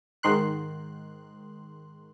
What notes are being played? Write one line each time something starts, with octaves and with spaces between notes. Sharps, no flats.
G#2 D#3 C6 F#6